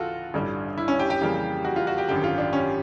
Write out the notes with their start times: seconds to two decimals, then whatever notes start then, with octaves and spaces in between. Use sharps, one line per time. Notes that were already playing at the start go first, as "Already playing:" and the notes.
Already playing: C#2 C#3 E3 F4 F#4 A4
0.34 A1 G2 D3 G3
0.78 E4
0.88 C#4
0.99 G4
1.10 G4
1.21 F2 C#3 E3 G3 A#3
1.65 F#4
1.76 F4
1.87 F#4
1.98 G4
2.09 G#1 F#2 D3 G4
2.24 F4
2.38 D4
2.53 C#4